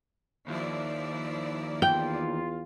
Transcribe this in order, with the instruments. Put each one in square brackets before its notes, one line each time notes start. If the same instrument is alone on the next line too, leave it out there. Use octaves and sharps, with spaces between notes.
[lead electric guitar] D#2 [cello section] F3 E4 D5
[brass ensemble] E2 F4 [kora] G5